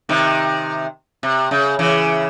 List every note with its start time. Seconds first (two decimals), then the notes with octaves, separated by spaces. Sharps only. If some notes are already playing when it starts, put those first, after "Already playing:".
0.09 C3 D#3
1.23 C3
1.51 C#3
1.79 C#3 E3